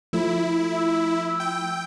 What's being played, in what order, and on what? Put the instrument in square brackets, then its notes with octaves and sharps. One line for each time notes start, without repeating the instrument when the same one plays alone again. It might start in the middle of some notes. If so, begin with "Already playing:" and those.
[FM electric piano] F3 A3 [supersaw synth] E4
[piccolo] E6
[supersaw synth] G5